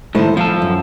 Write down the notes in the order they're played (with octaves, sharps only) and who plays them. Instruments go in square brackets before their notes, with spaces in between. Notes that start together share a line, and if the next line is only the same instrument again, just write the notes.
[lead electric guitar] A2 D#3 [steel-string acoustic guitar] E4 A4 C5
[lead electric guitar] F3 A4 [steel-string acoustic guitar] F5
[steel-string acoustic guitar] F#2